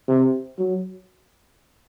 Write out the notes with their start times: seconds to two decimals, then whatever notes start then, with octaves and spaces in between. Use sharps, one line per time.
0.08 C3
0.59 F#3